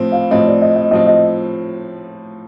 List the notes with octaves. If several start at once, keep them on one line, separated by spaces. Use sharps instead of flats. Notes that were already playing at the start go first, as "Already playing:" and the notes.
Already playing: A2 F3 C4
F5
A2 F3 C4 D#5
D5
D#5
D#5
A2 F3 C4 D#5
D#5